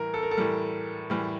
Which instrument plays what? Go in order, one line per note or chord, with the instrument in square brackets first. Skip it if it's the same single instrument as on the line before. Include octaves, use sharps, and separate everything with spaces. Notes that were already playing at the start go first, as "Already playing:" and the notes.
Already playing: [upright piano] A2 E3 G3 [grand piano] A#4
[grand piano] A4
A#4
A4
[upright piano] A2 E3 G3
A2 E3 G3